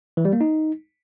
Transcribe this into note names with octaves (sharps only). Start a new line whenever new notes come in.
E3
G3
A#3
D#4